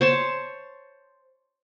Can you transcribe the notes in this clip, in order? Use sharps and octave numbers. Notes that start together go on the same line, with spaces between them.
C5 C#5 A5